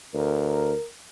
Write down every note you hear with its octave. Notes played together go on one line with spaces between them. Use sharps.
D2 A#4